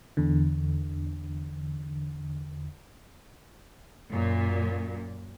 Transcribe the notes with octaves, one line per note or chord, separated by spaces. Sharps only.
E2 D3
F#2 A#2